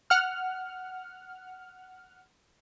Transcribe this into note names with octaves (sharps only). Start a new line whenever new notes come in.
F#5 F6